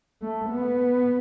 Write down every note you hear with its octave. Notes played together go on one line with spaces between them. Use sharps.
A3
B3